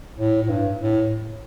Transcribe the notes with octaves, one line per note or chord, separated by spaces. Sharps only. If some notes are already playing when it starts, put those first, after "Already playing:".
A2
A2
G2
A2